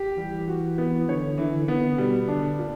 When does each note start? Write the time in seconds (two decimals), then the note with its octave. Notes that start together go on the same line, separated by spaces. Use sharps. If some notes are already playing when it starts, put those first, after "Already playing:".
Already playing: G4
0.17 E3 G3
0.48 F#4
0.78 B3
1.09 D3 C#5
1.38 D3 E3
1.68 D3 B3
1.98 B2 G3
2.28 D3 D4
2.59 A#2